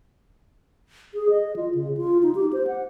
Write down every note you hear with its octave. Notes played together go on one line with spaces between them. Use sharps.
G#4
D#5
F4
C#3
F4
D#4
G4
C5
F#5